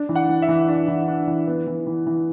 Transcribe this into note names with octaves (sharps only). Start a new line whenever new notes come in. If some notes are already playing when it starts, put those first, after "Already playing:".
Already playing: D4
E3
F#5
E3
E5
E3
D4
E3
D4
E3
B3
E3
E3
E3